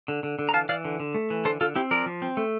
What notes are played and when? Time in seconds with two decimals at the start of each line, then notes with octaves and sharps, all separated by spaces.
0.08 D3
0.23 D3
0.39 D3
0.49 A#5
0.53 E3 F5 A5
0.69 E3 D5 F5
0.85 D3
1.00 D3
1.15 A3
1.30 E3
1.45 D3 A4 C5
1.61 D3 F4 A4
1.75 C4 E4 G4
1.91 F3 A#4 D5
2.06 F3
2.22 C4
2.37 A3